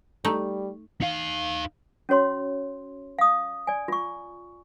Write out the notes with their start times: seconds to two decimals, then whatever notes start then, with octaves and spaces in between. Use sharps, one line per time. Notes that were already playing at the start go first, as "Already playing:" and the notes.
0.25 G3 A3 D#4
1.02 D#4 F5
2.09 C#4 F#4 C#5 C6
3.19 F5 D#6
3.67 D5 G#5
3.88 F4 C#6